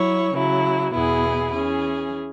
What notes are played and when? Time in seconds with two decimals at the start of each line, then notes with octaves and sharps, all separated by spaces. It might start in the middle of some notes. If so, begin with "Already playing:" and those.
Already playing: F#3 E4 C#5
0.34 C#3 F#3 E4
0.94 E2 B2 B3 E4 G#4
1.53 E3 C#4 G#4